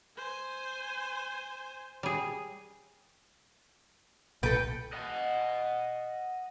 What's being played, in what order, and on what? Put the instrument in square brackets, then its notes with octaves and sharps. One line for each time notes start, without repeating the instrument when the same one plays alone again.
[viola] C5 G#5
[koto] G3 G#4
[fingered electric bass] B1 A#2 [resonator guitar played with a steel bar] A4 B4 [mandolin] G5
[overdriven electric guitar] D#5 F#5